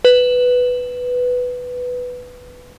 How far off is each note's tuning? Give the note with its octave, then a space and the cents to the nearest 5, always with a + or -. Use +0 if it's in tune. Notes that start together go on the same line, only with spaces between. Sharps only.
B4 +5